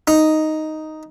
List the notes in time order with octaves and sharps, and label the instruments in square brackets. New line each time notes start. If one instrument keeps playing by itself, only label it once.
[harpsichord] D#4